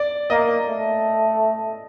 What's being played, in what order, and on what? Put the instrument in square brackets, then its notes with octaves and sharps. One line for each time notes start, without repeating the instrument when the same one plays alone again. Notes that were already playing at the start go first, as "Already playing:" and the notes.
Already playing: [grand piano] D5
[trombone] A#3 [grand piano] D#5
[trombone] A3